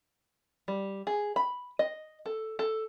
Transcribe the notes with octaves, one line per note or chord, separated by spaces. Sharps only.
G3
G#4
B5
D#5
A4
A4